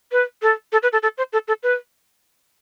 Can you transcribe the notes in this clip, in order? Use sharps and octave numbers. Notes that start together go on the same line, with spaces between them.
B4
A4
A4
B4
A4
A4
C5
A4
A4
B4